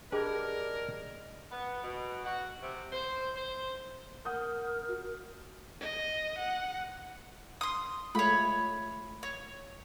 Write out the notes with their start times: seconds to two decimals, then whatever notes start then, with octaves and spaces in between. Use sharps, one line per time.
0.12 D4 G4 G#4 A#4 B4 D5 D#5 G#6
1.51 B3
1.84 B2
2.25 F#4
2.61 C3
2.93 C5
3.36 C5
4.25 A#4 F#5 D#6 G6
4.89 F#4
5.81 D#5
6.38 F#5
7.61 C6 D#6
8.15 G#3 A3 F4 C#5 B5
9.23 C#5